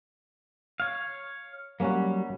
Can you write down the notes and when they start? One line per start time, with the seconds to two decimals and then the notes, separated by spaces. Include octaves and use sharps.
0.80 C#5 F5
1.80 F#3 G3 A#3 C#4 F#4